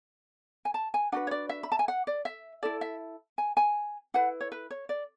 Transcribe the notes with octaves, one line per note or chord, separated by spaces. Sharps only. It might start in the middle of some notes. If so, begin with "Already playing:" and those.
G#5
A5
G#5
D4 F#4 B4 F#5
C#5
D5
E5
B5
A5
G#5
F#5
D5
E5
E4 A4 D5
E5
G#5
G#5
E4 B4 F#5
C#5
B4
C#5
D5